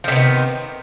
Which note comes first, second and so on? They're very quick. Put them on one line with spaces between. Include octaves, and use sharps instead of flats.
F3 C3 B3 D#3